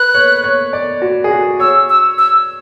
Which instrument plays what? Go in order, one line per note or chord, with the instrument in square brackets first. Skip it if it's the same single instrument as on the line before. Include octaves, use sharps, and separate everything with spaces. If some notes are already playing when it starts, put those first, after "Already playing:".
Already playing: [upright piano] B4 [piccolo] F#6
[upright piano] C#5
C#5
D5
F#4
G#4
F#4
[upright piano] C#5 [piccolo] E6
[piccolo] E6
E6